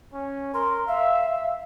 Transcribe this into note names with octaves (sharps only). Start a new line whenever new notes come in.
C#4
A#4 C6
E5 F5